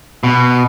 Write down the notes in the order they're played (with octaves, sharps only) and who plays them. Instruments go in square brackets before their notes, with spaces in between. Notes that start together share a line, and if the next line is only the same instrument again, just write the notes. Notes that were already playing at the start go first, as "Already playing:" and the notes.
[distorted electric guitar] B2